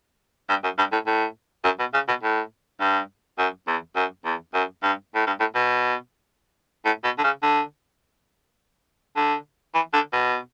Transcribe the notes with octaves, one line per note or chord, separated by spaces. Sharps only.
G2
F#2
G2
A2
A2
F#2
B2
C#3
B2
A2
G2
F#2
E2
F#2
E2
F#2
G2
A2
G2
A2
B2
A2
B2
D3
C#3
D3
D3
E3
D3
B2